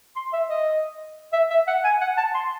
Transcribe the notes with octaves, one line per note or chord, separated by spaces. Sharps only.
C6
E5
D#5
E5
E5
F#5
G#5
F#5
A5
C6